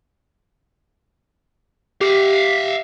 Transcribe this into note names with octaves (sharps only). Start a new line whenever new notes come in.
G4 E5 F5